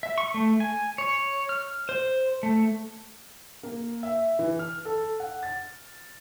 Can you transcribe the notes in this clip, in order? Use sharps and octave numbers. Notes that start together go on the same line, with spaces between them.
E5
C#6
A3
G#5
C#5
F6
C5
A3
A#3
E5
E3
F6
A4
F#5
A6